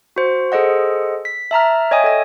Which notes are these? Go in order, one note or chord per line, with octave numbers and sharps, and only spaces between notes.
F#4 C5
G#4 A4 C5 D#5 F#5
B6
E5 A5 A#5 F6
C#5 D#5 E5 G5 G#5 D#6
A4 D#5